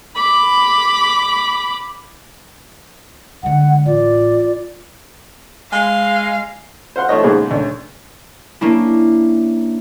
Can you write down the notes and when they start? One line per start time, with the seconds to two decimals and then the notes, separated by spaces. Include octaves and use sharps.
0.16 B5 D6
3.43 D3 G#3 F#5
3.86 A1 F4 D5
5.72 G#3 F5
6.96 C5 F5 F#5 C6
7.09 F3 A3 C#5 D#5
7.23 G#2 C#3 A#3 B3 G#4 C5
7.51 D2 C#4
8.61 A#3 C#4 D4 E4